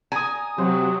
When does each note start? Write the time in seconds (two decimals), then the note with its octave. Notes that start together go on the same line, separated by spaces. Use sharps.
0.12 G#5 A#5 D#6
0.58 C3 F#3 C5